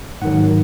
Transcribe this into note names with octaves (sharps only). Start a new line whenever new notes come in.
G#2 D#3 F#3 F#5